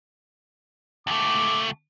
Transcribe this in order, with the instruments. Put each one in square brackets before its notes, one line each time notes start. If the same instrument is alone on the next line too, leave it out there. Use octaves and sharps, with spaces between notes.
[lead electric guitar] C#2 A3 [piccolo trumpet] D6